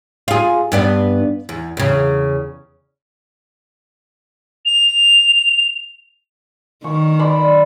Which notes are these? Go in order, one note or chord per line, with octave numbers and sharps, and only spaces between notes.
F4 G#4
G2 B3 D4
E2
E2 C#3
F7
D#3 C#6
D5 B5 C6